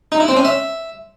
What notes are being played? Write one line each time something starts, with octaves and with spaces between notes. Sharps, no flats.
D#4
E4
C4
C#4
E5